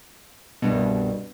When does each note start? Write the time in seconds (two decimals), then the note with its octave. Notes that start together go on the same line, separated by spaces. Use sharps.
0.62 C2 G2 B2